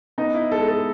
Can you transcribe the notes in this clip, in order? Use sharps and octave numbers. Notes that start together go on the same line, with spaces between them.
B3 D#4
E4
G#3 A4
A4